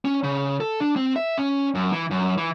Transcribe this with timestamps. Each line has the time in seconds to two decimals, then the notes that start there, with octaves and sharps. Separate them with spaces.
0.05 C#4
0.24 C#3
0.60 A4
0.80 D4
0.96 C4
1.16 E5
1.38 C#4
1.75 F#2
1.92 E3
2.11 F#2
2.38 E3